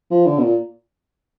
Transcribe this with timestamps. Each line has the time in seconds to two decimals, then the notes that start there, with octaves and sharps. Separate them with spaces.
0.11 F3
0.27 D3
0.38 B2
0.44 A#2